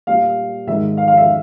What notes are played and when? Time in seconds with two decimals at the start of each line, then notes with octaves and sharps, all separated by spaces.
0.07 A#2 G3 F5
0.67 G#2 D#3 G#3 E5
0.97 F5
1.08 F5
1.17 E5